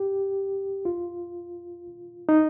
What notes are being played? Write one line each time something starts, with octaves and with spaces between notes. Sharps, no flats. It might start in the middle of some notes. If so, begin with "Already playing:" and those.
Already playing: G4
F4
D#4